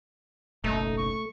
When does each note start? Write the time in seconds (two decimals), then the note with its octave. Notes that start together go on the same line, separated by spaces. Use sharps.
0.64 F#1 B1 A3 D#4
0.98 C#6